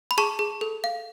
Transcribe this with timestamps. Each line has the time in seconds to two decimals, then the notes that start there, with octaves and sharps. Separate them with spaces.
0.11 B5
0.18 G#4 A5 C#6
0.39 G#4
0.61 A4
0.84 F5